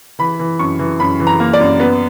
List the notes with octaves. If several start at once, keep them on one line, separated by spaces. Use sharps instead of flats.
E3 B5
E3
F#2 C#6
E3
F#2 B5
E3
A#5
A#3
D5
F#2
B3